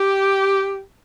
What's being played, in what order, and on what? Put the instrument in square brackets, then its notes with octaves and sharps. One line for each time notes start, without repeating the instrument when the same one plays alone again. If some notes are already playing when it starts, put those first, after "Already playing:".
Already playing: [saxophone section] G4